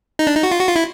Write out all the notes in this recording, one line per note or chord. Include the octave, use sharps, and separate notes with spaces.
D#4
D4
D#4
F#4
F4
F#4
F4
E4